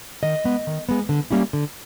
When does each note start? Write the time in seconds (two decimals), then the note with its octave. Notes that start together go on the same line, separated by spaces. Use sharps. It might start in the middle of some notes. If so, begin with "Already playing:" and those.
0.23 D#3 D#5
0.44 G#3 B3
0.67 D#3
0.89 G#3 B3
1.09 D3
1.31 G3 A#3 C#4 E4
1.53 D3